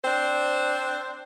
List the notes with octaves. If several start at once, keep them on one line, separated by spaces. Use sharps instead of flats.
C4 D4 C5